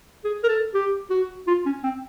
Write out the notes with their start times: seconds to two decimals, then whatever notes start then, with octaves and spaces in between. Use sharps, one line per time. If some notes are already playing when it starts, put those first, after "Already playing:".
0.24 G#4
0.44 A#4
0.48 A4
0.74 G4
1.10 F#4
1.47 F4
1.66 C#4
1.83 C4